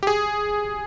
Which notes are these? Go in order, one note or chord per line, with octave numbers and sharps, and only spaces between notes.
G4
G#4